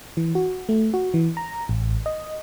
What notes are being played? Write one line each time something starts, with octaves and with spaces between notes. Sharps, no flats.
E3
F#4
A3
F#4
E3
A#5
A1
D#5